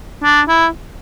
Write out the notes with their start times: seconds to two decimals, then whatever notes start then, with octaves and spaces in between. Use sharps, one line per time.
0.23 D4
0.48 E4